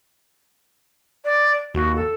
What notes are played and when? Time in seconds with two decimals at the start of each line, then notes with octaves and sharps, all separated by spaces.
1.25 D5
1.75 D#2 F#4
1.96 A4